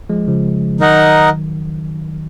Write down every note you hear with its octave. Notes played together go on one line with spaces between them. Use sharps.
F3 G#3
C#3 F3
D#3 F#3 D#4 A#4 D#5 F#5